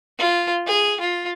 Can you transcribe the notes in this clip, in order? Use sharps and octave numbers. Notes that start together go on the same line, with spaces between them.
F4
G#4
F4